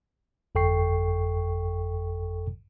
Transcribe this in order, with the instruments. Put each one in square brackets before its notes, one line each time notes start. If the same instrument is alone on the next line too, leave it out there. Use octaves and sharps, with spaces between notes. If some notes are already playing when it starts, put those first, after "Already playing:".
[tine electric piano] G1 F2 A4 G5 C#6 C7